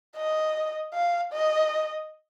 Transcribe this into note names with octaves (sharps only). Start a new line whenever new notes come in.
D#5
F5
D#5